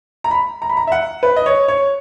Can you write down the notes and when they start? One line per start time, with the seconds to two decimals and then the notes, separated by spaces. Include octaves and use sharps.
0.24 A#5
0.31 B5
0.62 A#5
0.70 B5
0.77 A#5
0.87 E5
0.92 F#5
1.23 B4
1.36 D#5
1.46 C#5
1.68 C#5